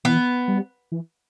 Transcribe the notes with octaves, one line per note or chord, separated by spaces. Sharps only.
E3 B3
G3
E3